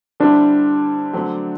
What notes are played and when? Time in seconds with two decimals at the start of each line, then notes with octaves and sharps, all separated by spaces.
0.20 D3 G3 C4 D4 E4
1.13 D3 F#3 A3 C4